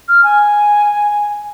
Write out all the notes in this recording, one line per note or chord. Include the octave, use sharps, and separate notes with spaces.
F6
G#5